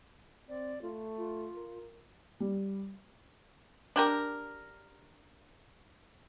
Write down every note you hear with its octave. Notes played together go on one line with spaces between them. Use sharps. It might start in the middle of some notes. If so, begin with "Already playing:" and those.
C4 D5
A3 F4
F4
A#4
G3
D4 G4 A#4